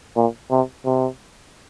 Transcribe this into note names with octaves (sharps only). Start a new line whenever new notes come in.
A#2
C3
C3